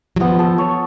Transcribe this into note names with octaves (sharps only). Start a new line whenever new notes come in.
F#3
F3 B3
A4
C#5